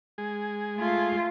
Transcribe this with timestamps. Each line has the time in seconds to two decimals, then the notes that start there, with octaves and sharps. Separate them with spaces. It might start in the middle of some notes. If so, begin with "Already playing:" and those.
0.18 G#3 G#4
0.76 A3 F4